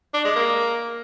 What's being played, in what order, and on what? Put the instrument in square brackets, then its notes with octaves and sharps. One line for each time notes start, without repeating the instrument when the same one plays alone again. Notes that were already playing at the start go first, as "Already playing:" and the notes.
[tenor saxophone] D4
G#3
A#3